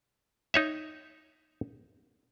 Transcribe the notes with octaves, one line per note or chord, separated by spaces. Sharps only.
D#4 C#5 E5